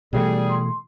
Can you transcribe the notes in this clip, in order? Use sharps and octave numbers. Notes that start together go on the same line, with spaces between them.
B2 E3 G3 A3 G#4
C6